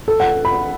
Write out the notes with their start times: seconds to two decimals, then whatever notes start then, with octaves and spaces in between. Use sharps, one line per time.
0.08 A4
0.20 F#5
0.45 B5